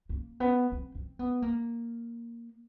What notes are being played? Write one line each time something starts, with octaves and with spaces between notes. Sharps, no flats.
A#3
B3
C4
C4
B3
A#3